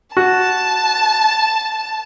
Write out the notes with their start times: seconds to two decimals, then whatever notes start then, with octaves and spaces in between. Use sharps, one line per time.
0.17 F#4 A5